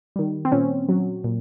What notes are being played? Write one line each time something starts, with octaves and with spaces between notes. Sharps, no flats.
D#3 G3
C4
A#2 C#4
F#3
A#2